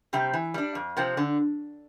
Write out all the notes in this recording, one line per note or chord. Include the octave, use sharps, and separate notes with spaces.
C3 G3 C4 G4
E3
G3 D4
F2
C3 F3 C4
D3